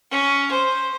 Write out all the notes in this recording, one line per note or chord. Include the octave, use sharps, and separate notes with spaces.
C#4
C5